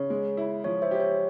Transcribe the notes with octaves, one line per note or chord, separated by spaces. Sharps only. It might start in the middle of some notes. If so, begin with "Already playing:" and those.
Already playing: C#3 C#5
G#3
E4
F3 C#5
C5 E5
G4
C#5